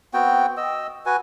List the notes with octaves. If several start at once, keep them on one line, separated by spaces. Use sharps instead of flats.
B3 C4 F#4 G5
D#5 E6
F#4 B4 G#5